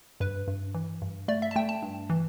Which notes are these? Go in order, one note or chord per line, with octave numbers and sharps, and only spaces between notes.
G2 B4
G2
E3
G2
A3 D5
E5
A5
A3 G5
A5
G2
E3